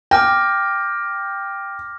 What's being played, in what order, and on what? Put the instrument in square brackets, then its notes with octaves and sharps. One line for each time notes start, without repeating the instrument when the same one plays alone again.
[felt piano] G5 [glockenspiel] D6 F6 A#6